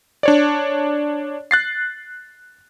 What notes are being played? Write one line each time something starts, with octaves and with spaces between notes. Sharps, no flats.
D4 C#5 D5
F#6 A6 C7